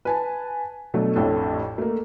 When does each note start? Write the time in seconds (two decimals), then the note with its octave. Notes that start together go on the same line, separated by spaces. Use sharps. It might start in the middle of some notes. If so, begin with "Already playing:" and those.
0.05 B4 G#5 A5
0.94 B2 F#3 A3 D4
1.16 A1 F2 A2 E3 D4 A4
1.78 A3 A#3